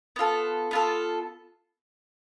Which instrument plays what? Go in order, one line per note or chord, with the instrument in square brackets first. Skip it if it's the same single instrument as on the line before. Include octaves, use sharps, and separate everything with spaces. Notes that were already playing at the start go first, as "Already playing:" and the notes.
[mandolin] B3 F4 A4
B3 F4 A4